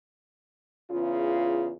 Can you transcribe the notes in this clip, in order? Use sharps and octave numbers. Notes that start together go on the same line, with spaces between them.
E2 C#3 F4